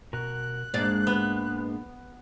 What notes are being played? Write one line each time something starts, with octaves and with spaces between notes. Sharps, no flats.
B2 F#4 A#4 F#6
G#2 G#3 A#3 D4 D5
B3